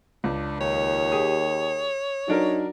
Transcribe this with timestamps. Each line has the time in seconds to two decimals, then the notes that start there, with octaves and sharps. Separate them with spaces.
0.24 C#2 D4
0.60 D#2 C#5
1.12 G4 G#4 D#6
2.28 F#3 D4 D#4 A#4